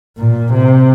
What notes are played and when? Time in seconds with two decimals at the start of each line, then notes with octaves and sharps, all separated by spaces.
0.18 A#2
0.54 C3